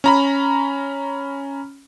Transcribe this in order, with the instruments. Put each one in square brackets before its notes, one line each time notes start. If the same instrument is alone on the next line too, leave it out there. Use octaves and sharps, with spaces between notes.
[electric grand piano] C#4 A#5 B5